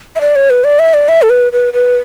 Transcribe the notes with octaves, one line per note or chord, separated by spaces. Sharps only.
E5
D5
C#5
B4
D5
E5
D5
E5
A4
B4
B4
B4